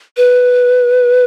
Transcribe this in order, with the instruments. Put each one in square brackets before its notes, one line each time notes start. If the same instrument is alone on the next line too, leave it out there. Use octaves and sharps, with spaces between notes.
[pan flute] B4